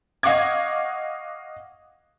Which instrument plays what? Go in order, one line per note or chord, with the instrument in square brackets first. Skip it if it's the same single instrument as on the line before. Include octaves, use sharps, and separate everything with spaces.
[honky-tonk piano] D#5 F5 F#5 C#6 D6 G#6